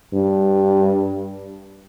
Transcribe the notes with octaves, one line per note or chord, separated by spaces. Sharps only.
G2